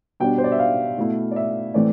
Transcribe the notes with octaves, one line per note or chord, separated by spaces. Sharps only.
B2 G3 D4 G5
C5
D5
E5
F5
B2 A3 E4
D5
E5
A2 E3 A3 C4 D5